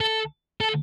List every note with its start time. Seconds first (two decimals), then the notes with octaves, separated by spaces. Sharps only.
0.01 A4
0.61 A4